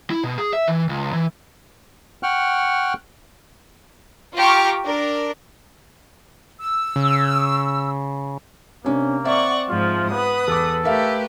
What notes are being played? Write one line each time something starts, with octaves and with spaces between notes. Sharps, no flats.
E4
B2
G#4
E5
E3
C#2
E3
F#5 G5 C#6 F6 F#6
F4 G4 A#5 C#6 D6 F6
D4 A#4
E6
C#3
C3 A#3 C#4 D4
C4 D5 E5 F#5 C#6
G#2 F3 F4
B3 B4 D#6
E2 A4 D6
A3 G4 A#4 B4 E5 F5